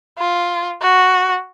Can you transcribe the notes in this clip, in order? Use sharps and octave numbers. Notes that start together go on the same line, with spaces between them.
F4
F#4